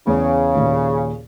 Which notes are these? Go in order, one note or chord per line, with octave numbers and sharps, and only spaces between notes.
E2 C#3
D#2 A#2